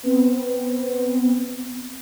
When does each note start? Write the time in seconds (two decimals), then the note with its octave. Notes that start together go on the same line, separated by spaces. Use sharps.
0.03 B3 C4